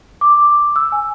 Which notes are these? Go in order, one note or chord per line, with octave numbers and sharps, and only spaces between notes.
D6
E6
G#5